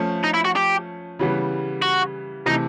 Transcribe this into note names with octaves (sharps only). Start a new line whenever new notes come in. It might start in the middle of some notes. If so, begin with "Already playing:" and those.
Already playing: F3 A3 C#4
D#4
E4
F#4
G4
C#3 E3 G3 B3
F#4
C3 E3 A3 D#4